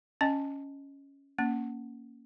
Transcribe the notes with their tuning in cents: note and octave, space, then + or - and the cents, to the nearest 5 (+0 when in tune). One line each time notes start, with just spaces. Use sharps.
C#4 +0 D#5 +0 G#5 +0
A#3 +0 C#4 +0